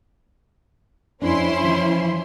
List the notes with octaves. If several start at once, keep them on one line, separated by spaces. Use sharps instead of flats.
F2 C#4 D4 E4 C6
E3 F3